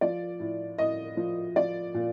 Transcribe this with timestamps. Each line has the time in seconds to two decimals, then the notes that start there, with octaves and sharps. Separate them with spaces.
0.01 F3 D5
0.40 A2
0.78 A2 D#5
1.17 F3
1.56 F3 D5
1.94 A#2